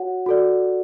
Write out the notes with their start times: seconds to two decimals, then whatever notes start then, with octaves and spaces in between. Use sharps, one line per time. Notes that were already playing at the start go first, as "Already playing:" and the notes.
Already playing: F#4 C#5 F#5
0.26 F#4 A4 D5